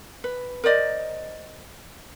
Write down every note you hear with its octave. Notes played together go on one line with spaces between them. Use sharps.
B4
A#4 C5 D5 D#5